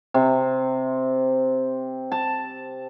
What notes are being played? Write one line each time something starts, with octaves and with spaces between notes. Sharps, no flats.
C3
A5